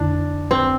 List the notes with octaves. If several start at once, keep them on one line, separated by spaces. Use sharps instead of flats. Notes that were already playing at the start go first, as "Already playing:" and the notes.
Already playing: F2 D3 A3 D4 E4
C4